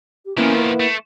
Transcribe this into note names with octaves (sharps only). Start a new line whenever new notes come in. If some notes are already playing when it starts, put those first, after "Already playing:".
G4
D#3 F3 A#3 B3 C#4 E4
B4
A3